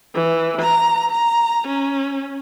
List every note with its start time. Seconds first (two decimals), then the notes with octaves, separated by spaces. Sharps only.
0.15 E3
0.62 A#5
1.11 A#5
1.68 C#4